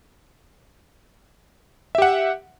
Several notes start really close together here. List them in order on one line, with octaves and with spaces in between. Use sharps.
E5 G4 F#5